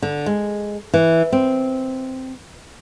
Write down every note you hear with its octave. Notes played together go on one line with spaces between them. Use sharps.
D3
G#3
E3
C4